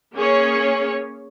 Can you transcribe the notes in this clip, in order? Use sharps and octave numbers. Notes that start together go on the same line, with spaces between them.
A#3 C#4 G#4 C#5